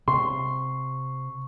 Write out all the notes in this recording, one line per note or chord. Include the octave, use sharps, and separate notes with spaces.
C3 C6 C#6